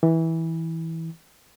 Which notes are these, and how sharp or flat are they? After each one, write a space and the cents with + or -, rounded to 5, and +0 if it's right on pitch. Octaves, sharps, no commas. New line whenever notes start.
E3 -15